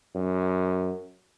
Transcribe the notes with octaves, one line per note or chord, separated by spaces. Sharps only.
F#2